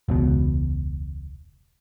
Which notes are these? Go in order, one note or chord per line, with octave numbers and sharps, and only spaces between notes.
E1 C#2 B2